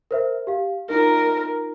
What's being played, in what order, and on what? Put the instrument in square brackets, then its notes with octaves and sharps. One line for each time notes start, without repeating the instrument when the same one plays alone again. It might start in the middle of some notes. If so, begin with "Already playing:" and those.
[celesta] A#4 C5 E5
G4 F5
[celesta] D#4 F4 [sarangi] A#4